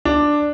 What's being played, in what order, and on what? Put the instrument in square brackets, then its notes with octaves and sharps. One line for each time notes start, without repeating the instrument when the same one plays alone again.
[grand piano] D4